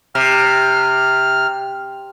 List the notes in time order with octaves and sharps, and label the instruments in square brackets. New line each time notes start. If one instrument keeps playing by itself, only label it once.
[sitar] C3 [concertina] F6